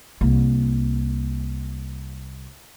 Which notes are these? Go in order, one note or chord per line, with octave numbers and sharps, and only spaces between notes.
C2 A#3